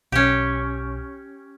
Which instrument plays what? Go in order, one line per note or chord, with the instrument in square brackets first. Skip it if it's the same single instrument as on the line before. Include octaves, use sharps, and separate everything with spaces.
[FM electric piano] B1 [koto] C#4 G4